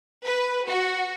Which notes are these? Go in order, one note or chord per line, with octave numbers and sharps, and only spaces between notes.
B4
F#4